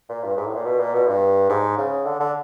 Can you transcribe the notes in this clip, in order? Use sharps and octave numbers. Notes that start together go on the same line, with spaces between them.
A#2
G2
G#2
A2
A#2
B2
A#2
B2
G2
G#2
C#3
D3
D3